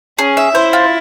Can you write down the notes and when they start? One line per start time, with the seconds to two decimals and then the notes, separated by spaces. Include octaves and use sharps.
0.19 C#4 G#4
0.37 E5
0.55 E4 C5
0.73 F4